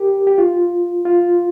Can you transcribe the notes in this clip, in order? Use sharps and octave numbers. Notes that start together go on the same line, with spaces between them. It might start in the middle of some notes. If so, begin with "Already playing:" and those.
Already playing: G4 A#4
G4
F4
F4